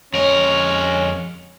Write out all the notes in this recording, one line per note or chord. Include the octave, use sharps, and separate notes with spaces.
F2 G#3 C#4 A#4 C#5